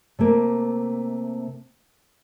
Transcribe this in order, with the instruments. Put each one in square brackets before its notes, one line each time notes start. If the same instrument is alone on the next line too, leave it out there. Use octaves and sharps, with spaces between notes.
[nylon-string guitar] C3 A3 A#3